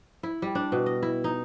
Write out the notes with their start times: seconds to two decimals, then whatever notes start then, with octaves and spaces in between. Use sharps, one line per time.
0.23 E4
0.42 G3
0.55 D4
0.72 B2
0.86 D#5
1.02 E4
1.24 D#4